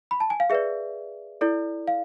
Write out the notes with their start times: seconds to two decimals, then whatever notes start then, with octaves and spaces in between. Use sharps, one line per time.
0.11 B5
0.20 A5
0.30 G#5
0.40 F5
0.50 G#4 B4 D5 E5
1.41 E4 A4 D5
1.88 F5